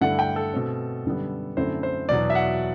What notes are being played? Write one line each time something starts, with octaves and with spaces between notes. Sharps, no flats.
G2 D3 A3 E4 F#5
G5
A4
B2 A3 C4
F#2 D3 G3 B3
F#2 D3 A3 C4 E4 C5
C5
E2 B2 F#3 D5
E5
F#5